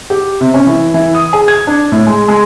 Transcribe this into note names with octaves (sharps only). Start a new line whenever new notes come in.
G4
C3
C#4
E3
E3
D#6
G#4
G#6
D4
A2
G#3
G#3